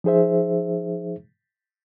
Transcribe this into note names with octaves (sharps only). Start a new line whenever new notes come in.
F3 D#4 G#4 C5 E5